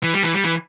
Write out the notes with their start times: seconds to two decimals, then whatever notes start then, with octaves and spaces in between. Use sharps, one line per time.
0.03 E3
0.14 G3
0.23 E3
0.34 G3
0.44 E3